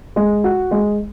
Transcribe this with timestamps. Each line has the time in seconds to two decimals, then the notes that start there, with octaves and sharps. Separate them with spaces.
0.16 G#3
0.44 F#4
0.71 G#3